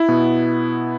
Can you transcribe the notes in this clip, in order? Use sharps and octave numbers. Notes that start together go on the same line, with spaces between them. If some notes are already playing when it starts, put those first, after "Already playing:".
Already playing: E4
B2 B3